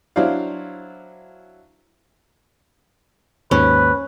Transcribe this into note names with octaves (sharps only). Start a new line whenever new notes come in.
F#3 D4 E4 C5 D5 F5
D#2 G#2 C#4 B4